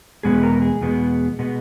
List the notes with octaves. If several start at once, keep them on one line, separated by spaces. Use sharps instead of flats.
E2 B2 G#3 B3 G#4
A#4
G#4
E2 B2 G#3 B3
B2 G#3 B3